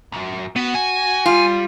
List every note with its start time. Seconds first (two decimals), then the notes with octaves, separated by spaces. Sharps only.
0.12 B1 F#2
0.56 B3 F#4
0.75 G#5
1.26 G3 F4